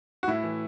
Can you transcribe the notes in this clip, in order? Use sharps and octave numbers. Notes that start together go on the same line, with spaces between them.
F#4
A2 E4
E3